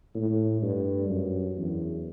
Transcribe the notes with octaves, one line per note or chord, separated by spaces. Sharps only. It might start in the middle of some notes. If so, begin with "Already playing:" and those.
A2
G2
F#2
E2